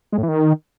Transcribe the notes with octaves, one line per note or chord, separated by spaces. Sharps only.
G#3
A2
E3
D#3